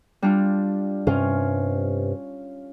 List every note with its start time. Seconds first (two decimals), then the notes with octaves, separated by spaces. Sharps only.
0.22 G3 D4 F4
1.07 G2 C3 C#4 F4